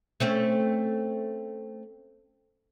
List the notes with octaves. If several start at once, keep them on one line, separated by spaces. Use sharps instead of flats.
A3 C4 C#4